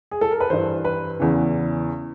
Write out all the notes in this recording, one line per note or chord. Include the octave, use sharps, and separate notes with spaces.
G#4
A4
A#4
B4
G2 E3 C5
B4
E2 C#3 E3